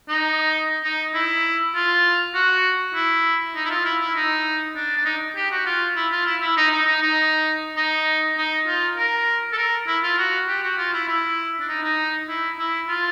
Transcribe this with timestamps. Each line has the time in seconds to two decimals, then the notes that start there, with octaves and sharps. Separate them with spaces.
0.09 D#4
0.84 D#4
1.14 E4
1.75 F4
2.34 F#4
2.95 E4
3.55 D#4
3.65 E4
3.70 F4
3.85 E4
4.00 E4
4.15 D#4
4.75 D4
4.97 D4
5.05 D#4
5.36 G4
5.51 F#4
5.66 F4
5.96 E4
6.11 F4
6.26 E4
6.41 E4
6.57 D#4
6.71 D#4
6.86 D#4
7.01 D#4
7.76 D#4
8.37 D#4
8.67 F4
8.97 A#4
9.52 A4
9.57 A#4
9.87 E4
10.03 F4
10.18 F#4
10.47 G4
10.62 F#4
10.78 F4
10.93 E4
11.08 E4
11.60 D4
11.68 D#4
11.83 D#4
12.29 E4
12.59 E4
12.88 F4